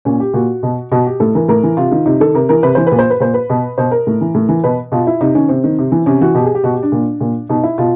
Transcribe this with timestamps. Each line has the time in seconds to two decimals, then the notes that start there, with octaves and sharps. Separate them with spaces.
0.05 A#2 C#4
0.20 G4
0.34 A#2 F#4
0.63 B2
0.92 B2 F#4
1.06 G4
1.20 A2 A4
1.35 E3 A#4
1.48 A2 A#4
1.63 E3
1.77 C3 F4
1.92 D#3
2.06 C3 D#4
2.20 D#3 A4
2.35 C3 A#4
2.49 E3 A#4
2.63 C3 B4
2.75 E3 C5
2.87 B4
2.92 A#2
2.99 C5
3.10 B4
3.20 A#2 C5
3.34 B4
3.50 B2
3.78 B2 C5
3.91 A#4
4.07 A2
4.21 E3
4.34 A2
4.49 E3
4.64 B2 B4
4.92 B2 F4
5.07 E4
5.21 C3 D#4
5.35 D#3 C#4
5.49 C3 C4
5.64 D#3
5.79 C3
5.92 E3
6.06 C3 C#4
6.21 E3 F#4
6.35 B2 G4
6.44 G#4
6.55 G4
6.64 B2 F#4
6.74 G4
6.83 D4
6.92 A#2
7.21 A#2
7.49 B2 D#4
7.63 E4
7.78 B2 F4